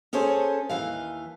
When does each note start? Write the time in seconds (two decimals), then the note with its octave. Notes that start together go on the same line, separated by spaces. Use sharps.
0.13 C#4 G#4 A4 C5 C#5
0.69 D#2 E3 F5